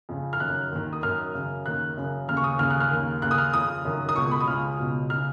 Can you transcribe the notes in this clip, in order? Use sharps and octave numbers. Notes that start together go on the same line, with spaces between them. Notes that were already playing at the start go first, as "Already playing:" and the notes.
F2 C#3
F6
F#2 D#3 F#6
D#2 D#3
D#6
F#2 D#3 F6
F#2 C#3
D#2 D#3 F#6
F#2 C#3
D#2 C#3 F6
C#6
D#6
D#2 C#3 F6
F#6
F6
D#2 D#3
D#2 C#3 F#6
D#6
F6
F2 C#3 D#6
F#2 D#3
D#6
C#2 B2 C#6
B5
D#6
C#2 C#3 F6
C#2 B2
C#3 F6